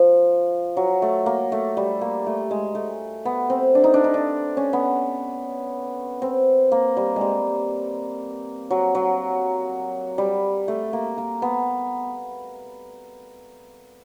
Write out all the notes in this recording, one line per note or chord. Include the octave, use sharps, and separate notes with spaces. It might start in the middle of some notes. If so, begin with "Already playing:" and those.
Already playing: F3
F#3
A3
A#3
A3
G3
A#3
A3
G#3
A3
B3
C4
D4
D#4
D4
D#4
D4
C#4
B3
C4
A#3
G3
G3 G#3
F#3
F#3
G3
A3
A#3
A#3
B3